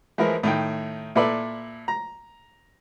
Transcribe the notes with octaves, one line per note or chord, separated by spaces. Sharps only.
E3 F3 G#3 E4 A#4
A2 D#3 G5
A#2 E4 A4 B4 D5 E5
A#5